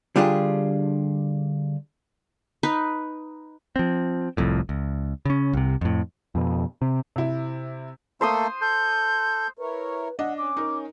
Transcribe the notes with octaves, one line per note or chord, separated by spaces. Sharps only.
D3 G3 D4 F4 G4 G#4
D#4 B4
F3 C4
F1 C2 F2 A2
C#2
C#3 C#4
C2 C3
F2 A2
F2 B2
C3
C3 E4
A3 A#3 A4 C5 C6 D#6
A4 G6
E4 A#4 B4 C#5
D4 D#5 F#5
C#4 D6
D#4 A#4